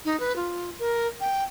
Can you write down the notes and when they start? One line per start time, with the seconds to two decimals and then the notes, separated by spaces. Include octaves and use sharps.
0.05 D#4
0.20 B4
0.36 F4
0.79 A#4
1.21 G5